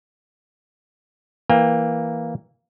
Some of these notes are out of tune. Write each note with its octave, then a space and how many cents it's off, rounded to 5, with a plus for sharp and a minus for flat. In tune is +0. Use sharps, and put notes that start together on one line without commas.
E3 +0 A#3 +0 G5 +45